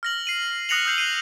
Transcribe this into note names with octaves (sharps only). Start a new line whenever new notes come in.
F6 A#6 F#7
C7 D#7 F#7
D#6 F#6 A#6 C#7 F7 F#7
D#6 E6 G6 C7 F#7
F#6 C7 D#7 G7